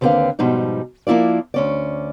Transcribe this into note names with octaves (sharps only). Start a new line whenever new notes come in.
D#2 D3 C4 G#4 B4 F5
G#2 B2 F3 G3 D#4
F3 A#3 E4 F4 D5
D2 C#4 D5